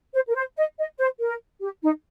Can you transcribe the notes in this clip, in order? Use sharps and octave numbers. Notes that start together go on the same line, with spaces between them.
C5
A#4
C5
D#5
D#5
C5
A#4
G4
D#4